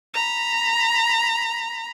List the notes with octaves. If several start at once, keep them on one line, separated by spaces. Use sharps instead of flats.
A#5 B5